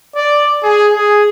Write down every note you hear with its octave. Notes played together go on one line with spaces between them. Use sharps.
D5
G#4
G#4